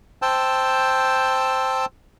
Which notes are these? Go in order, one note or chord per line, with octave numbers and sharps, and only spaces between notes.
C5 G5 A5 E6